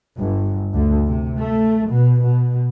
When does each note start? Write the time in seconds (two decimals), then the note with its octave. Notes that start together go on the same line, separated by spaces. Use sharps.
0.17 G1
0.73 D2
1.06 C3
1.39 A3
1.89 B2
2.22 B2